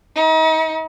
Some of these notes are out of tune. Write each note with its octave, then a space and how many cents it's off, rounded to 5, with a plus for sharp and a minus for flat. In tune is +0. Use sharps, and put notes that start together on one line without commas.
D#4 +40